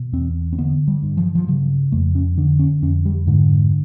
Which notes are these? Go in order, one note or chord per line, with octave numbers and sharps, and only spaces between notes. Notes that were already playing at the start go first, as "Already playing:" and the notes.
Already playing: B2
E2 C4
C4
D3 B3
G3
G2
F3
F3
C#3 F#3
F2 A3
C#4
D3 D4
C#4
F2 C#4
G3
G#2 D3